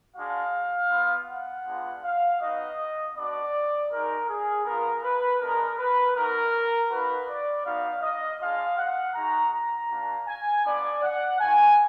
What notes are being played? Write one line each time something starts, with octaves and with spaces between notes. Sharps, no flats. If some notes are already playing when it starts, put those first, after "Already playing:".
G#3 D4 F#4 F5
B3 F4
F#5
G#3 B3 D4 F4
F5
B3 D#4 F#4 D#5
B3 D4 F#4 D5
G#3 D#4 F#4 A#4
G#4
B3 F4 A#4
B4
G#3 B3 D4 A#4
B4
B3 D#4 F#4 A#4
A#3 D#4 F#4 B4
D5
B3 D#4 F#4 F5
D#5
G#3 D4 F4 F5
F#5
G#3 D#4 F#4 A#5
A#5
A#3 D4 F#4
G#5
B3 D4 F4 D5
F#5
A#3 D#4 F#4 G#5